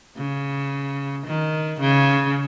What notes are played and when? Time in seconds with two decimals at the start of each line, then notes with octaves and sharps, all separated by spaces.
0.17 C#3
1.26 D#3
1.80 C#3